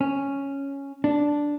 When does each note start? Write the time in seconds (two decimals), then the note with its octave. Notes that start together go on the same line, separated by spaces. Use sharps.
0.01 C#4
1.04 D4